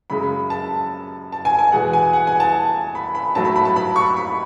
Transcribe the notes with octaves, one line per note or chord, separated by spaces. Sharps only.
F#2 C#3 G#3 B5
A5
A5
G#5
G#5
E2 B2 G#3 F#5
G#5
F#5
G#5
A5
B5
B5
G#2 F#3 A3 A5
B5
B5
A5
B5
C#6
B5